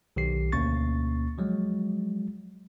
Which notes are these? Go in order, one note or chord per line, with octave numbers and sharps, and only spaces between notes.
B1 D#3 G4 C7
D2 B2 A#3 C#4 C#6 A6
F3 F#3 G#3